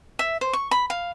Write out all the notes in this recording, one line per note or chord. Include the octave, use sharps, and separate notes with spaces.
E5
C5
C#6
B5
F5